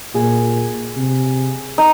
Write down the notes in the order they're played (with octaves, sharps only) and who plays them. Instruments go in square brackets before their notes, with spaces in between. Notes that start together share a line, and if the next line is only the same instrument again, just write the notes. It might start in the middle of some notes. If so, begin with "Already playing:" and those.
[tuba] A#2 [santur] G#4
[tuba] C3
[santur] D#4